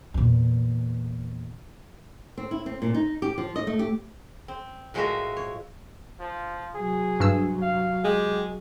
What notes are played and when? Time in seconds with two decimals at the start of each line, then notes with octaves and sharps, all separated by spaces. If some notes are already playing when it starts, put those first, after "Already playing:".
0.14 E2 A#2
2.38 C4
2.51 E4
2.66 C4
2.82 A#2
2.94 D#4
3.22 G4
3.38 F3
3.56 D#5
3.67 A3
3.79 G4
4.48 C4
4.94 A2 F3 G#3 F#4 A#4 E5
5.37 C#5
6.20 F3
6.75 C3 F#3 G#4
7.20 G2 E6
7.62 F5
8.05 G#3 G4